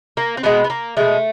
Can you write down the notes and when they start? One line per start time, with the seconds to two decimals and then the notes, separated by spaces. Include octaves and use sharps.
0.17 A#3
0.37 C4
0.43 B2 G#3 B3
0.64 B3
0.70 A#3
0.97 B2 G#3 A3